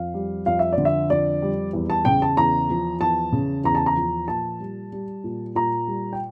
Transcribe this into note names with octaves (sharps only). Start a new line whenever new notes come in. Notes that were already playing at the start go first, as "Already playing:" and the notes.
Already playing: F2 F5
G3
F2 F5
E5
D5
D3
E5
F2 D5
G3
E2
A5
C#3 G5
A5
E2 A#5
F3
E2 A5
C#3
E2 A#5
A5
A#5
F3
A#2 A5
G3
G3
A#2
A#2 A#5
G3
G5